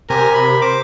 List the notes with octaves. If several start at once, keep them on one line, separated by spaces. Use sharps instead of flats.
C3 G4 A#4 G#5
B5
C5 D6